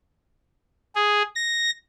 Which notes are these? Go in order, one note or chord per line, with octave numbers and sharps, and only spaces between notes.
G#4
A#6